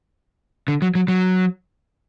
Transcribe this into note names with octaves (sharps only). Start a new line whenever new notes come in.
D3
F#3
F#3
F#3